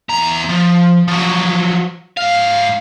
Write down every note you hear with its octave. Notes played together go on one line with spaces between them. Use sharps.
E2 A#5
F3
F3 F#3
G#2 F5